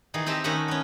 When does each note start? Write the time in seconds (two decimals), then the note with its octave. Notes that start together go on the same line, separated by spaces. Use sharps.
0.14 D#3 E3 G#4
0.26 C4 G4 D#5 E5 A5
0.44 D#3 A3 C#4 D#5 E5 F#5
0.68 B3 C#4